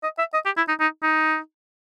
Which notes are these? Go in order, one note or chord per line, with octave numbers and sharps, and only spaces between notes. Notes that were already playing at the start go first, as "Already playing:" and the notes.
D#5
E5
D#5
G4
E4
D#4
D#4
D#4